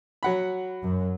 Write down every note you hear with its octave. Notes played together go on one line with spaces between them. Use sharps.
F#3 F#5 B5
F#2